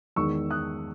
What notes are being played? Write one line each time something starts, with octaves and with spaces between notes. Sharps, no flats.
E2 D#3 G#3 C#6 E6
D#6 F#6